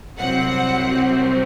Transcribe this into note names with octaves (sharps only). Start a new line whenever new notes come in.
C2 C3 F#3 C4 F#5